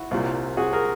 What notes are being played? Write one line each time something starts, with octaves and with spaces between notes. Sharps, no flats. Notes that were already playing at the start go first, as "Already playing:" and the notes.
Already playing: E4 F#4
C2 A#2 G3
F#4 G#4
G#4 A#4